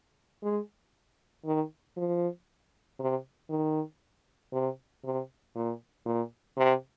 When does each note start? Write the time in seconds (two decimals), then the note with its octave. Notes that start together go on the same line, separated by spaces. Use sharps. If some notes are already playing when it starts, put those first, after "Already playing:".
0.43 G#3
1.45 D#3
1.97 F3
2.99 C3
3.50 D#3
4.53 C3
5.04 C3
5.56 A#2
6.06 A#2
6.57 C3